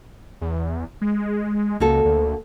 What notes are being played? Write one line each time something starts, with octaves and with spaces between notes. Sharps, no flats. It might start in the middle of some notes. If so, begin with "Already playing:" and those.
E2
G#3
C#2 A#3 F#4 A4
D2